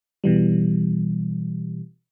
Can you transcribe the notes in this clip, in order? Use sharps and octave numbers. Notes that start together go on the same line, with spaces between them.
B2 E3 G3